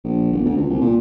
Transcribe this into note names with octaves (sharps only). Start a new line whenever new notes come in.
A#1
G1
D2
C#2
C2
A#2